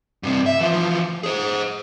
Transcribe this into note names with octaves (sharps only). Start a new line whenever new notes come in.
G2 C3
E5
E3 F3
G#4 C5